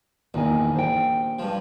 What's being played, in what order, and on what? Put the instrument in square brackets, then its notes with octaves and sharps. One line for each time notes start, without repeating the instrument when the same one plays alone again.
[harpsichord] A#1 [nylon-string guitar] E2 D#3 G#5
[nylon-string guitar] C5 G5
[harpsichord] G2 F3